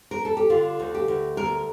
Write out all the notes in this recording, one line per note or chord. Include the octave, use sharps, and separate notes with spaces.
A#4
A4
G4
D3 F4
D2
G4
D2
D2 A#4